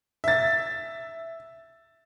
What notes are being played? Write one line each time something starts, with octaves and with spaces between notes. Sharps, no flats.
E5 A6